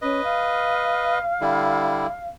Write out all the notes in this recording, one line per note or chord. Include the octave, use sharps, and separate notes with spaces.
C#4 B4 D#5
F5
D3 G3 E4